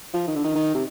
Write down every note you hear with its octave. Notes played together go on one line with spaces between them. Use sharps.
F3
D#3
D3
D#3
D#3
C3